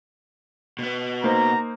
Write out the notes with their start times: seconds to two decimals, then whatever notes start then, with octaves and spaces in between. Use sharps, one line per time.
0.79 B2 B3
1.24 A#3 D#4 C5 A#5